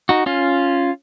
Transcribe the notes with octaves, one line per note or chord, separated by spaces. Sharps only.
D#4 F#4
C#4 F4